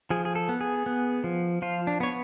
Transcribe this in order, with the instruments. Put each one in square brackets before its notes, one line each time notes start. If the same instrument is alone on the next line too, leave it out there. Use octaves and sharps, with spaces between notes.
[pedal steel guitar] F3 G#4
G#4
A4
B3
G#4
B3
F3
F3 F4
D4
B3 C#5